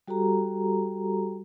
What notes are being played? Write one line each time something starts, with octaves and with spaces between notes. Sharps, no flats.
G3 F#4 G4 A4 A#5